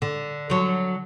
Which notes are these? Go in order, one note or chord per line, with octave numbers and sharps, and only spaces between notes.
D3
D3 F#3